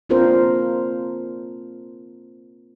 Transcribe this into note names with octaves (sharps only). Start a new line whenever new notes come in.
A#3 C4 D4 F4 A#4 C5